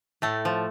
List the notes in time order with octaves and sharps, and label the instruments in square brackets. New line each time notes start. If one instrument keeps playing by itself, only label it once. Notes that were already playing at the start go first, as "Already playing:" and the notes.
[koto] A2 A3
F3